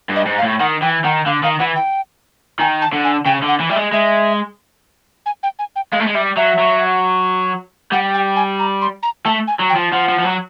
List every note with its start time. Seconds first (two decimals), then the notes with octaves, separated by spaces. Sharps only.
0.10 G2
0.16 D#5
0.26 G#2
0.38 F5
0.43 A2
0.60 D#3 F#5
0.82 E3 G5
1.04 D#3 F#5
1.26 D3 F5
1.43 D#3 F5
1.59 E3 F#5
1.76 G5
2.59 D#3 G#5
2.82 A5
2.93 D3
3.04 G#5
3.26 C#3 G5
3.42 D3
3.48 F#5
3.60 E3
3.69 G3 E5
3.76 G#3
3.92 G#3 E5
5.26 G#5
5.43 G5
5.59 G#5
5.76 G5
5.92 G#3 F5
5.99 A3
6.06 G#3
6.14 G3 E5
6.37 F#3 E5
6.59 F#3
7.92 G3 F#5
8.14 G5
8.36 G#5
8.59 A#5
8.82 C6
9.03 A#5
9.25 A3 A5
9.47 G#5
9.59 F#3
9.70 G5
9.75 F3
9.92 F3 F#5
10.09 F3
10.19 F3
10.25 F#3